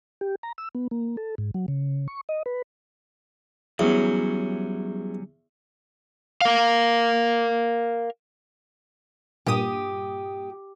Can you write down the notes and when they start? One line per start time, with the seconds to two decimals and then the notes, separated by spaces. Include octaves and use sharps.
0.21 G4
0.43 A#5
0.58 E6
0.75 B3
0.91 A#3
1.17 A4
1.38 G#2
1.54 F#3
1.68 C#3
2.08 C#6
2.29 D#5
2.46 B4
3.79 E2 F#3 G3 C#4
6.41 A#4 F5
9.46 G2 A#2 G4 D#6